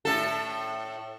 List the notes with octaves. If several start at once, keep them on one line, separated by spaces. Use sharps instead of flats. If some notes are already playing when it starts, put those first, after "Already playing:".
A2 A4